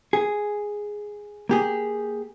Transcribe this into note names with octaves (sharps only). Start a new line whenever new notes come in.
G#4
A#3 G4 G#4